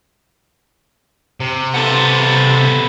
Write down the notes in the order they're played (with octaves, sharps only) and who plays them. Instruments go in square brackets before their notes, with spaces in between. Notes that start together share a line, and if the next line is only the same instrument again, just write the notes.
[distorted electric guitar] C3
[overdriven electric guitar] B3 A4